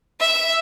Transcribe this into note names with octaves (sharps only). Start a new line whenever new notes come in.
E5